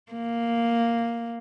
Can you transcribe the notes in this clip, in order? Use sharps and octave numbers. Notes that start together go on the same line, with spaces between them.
A#3